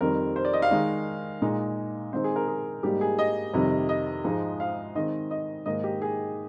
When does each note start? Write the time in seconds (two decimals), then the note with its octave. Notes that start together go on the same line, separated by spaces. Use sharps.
0.01 F2 D#3 G3 C4 A#4
0.36 C5
0.45 D5
0.53 D#5
0.62 F5
0.71 D#3 G#3 D#4
1.42 A#2 G#3 D#4
2.13 D#3 G#3 C4 D#4 C5
2.24 G#4
2.36 A#4
2.48 G#4
2.83 G#2 G3 A#3 D#4 G4
3.01 G#4
3.19 D#5
3.54 F2 C3 D#3 G3
3.89 D#5
4.25 G#2 F3 G#3 D#4
4.60 F5
4.95 D#3 G#3 C4 D#5
5.31 D#5
5.66 G#2 D#3 A#3 D#5
5.84 G4
6.02 G#4